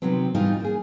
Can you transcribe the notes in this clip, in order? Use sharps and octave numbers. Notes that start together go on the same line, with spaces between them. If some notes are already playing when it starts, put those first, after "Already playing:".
C3 D#3 F#3 B3 C4
G#2 E3 G3 D#4 F4
A#3 G#4